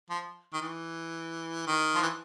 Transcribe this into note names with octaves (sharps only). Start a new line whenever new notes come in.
F3
D#3
E3
D#3
F3
E3